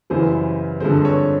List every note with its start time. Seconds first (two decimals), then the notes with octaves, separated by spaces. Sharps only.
0.10 F#2 C#3 E3 G3 B3 C5
0.80 G2 D3 F3 G#3 C4 C5
1.05 C#5